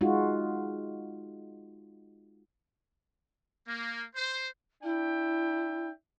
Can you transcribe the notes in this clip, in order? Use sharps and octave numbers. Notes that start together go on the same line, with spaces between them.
G#3 D#4 F4 F#4
A#3
C5
D4 E4 E5 G5